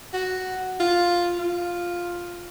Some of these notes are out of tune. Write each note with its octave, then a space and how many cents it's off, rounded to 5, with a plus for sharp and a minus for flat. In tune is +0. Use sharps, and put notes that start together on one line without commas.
F#4 +5
F4 +5
F4 +5